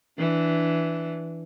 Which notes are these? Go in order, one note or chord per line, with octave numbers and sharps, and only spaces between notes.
E3 D4